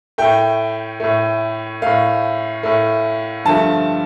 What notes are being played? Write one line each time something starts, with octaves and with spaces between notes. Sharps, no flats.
A2 A3 G5
A2 A3
A2 A3 F5
A2 A3
G2 D3 F3 A3 A5